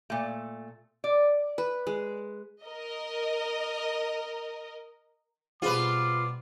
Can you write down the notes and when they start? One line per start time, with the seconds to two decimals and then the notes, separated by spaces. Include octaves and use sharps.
0.10 A#2 A3
1.04 D5
1.58 B4
1.87 G#3
2.63 A#4 D#5
5.62 B2 G3 C4 F4 F#4 G#4 B4 D6